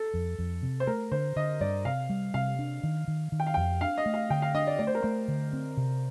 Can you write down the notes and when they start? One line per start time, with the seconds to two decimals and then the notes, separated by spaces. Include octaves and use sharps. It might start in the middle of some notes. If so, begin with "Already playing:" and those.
Already playing: A4
0.14 F2
0.39 F2
0.62 C3
0.80 C5
0.87 A3 A#4
1.12 D3 C5
1.36 D3 D#5
1.61 G2 D5
1.85 C3 F5
2.10 G3
2.34 C3 F5
2.59 D4
2.83 D#3
3.08 D#3
3.32 D#3
3.40 G5
3.47 F5
3.54 F2 G5
3.81 D4 F5
3.98 D#5
4.06 A3
4.14 F5
4.30 D3 G5
4.42 F5
4.54 D4 D#5
4.67 D5
4.79 A3 D5
4.87 C5
4.95 A#4
5.03 A3 C5
5.28 D3
5.53 C4
5.77 C3